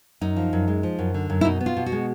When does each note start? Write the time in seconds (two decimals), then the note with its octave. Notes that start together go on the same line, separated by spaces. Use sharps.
0.21 F#2 D#4
0.36 F3
0.53 F#2
0.68 G#3
0.83 F3
0.99 F#2
1.14 D3
1.30 F#2
1.41 E4
1.45 B2 D#4
1.61 B3
1.66 F4
1.77 B2
1.86 F#4
1.92 G#3